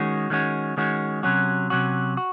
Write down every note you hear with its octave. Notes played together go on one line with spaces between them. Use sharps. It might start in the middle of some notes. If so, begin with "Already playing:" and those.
Already playing: D#3 G#3 C#4 F#4
D#3 G#3 C#4 F#4
D#3 G#3 C#4 F#4
C3 F#3 C#4 F#4
C3 F#3 C#4 F#4
F#4